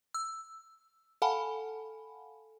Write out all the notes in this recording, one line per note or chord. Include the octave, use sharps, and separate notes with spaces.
E6
A4 F5 F#5 G#5 A5 B5